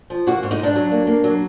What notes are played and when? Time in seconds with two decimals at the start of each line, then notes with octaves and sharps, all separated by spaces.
0.10 F3
0.26 A#3 F#4
0.43 G#2
0.51 D#4
0.59 G#2 D4
0.75 F#3
0.91 A#3
1.07 A#3
1.24 F#3